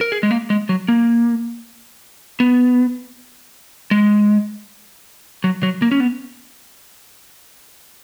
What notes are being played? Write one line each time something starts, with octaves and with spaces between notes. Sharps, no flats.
A#4
G#4
G#3
A#3
G#3
F#3
A#3
B3
G#3
F#3
F#3
A#3
C#4
B3